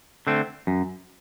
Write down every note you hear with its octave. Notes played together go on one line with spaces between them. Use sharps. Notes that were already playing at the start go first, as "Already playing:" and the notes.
D3 A3 C4
F#2